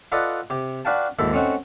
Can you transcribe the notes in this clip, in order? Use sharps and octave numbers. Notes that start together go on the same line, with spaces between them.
F4 A4 B4 D5 D#5 F#5
C3 G4
D4 F#4 B4 F5 G5 A5
A#1 D#2 G#2 D#3 A4 E5
A3 C4 C#4 D#4 F#4